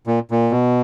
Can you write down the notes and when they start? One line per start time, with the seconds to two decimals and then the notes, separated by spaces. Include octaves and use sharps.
0.07 A#2
0.31 A#2
0.51 B2